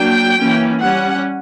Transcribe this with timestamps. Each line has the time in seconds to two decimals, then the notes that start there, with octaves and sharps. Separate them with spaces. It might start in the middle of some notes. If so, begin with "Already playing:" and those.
Already playing: F#3 A#3 D4 G5
0.36 E3 A#3 C#4
0.82 G3 C#4 F#5